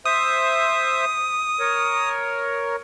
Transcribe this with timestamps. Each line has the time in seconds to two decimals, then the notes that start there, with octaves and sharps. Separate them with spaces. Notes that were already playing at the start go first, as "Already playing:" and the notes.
0.06 C5 E5 D#6
1.60 A#4 C#5